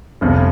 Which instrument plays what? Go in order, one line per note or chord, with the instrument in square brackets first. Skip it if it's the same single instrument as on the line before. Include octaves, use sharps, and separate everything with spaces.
[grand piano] G1 F2 C3